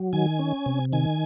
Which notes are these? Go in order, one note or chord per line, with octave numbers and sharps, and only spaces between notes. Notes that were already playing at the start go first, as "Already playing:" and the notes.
Already playing: F#3
D#3 G#5
C#4
C3
D#3 G#5